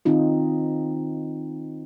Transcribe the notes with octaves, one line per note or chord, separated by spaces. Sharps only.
D#3 C4 D#4 F4